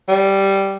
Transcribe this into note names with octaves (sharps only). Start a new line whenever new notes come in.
G3